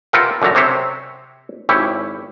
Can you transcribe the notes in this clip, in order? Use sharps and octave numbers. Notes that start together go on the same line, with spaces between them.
F4 G4 A#4 B4 E5 F#5
F#2 D3 A3 A#5
C3 C4 C5 C#5 E5
G#1 E4 G4 C#5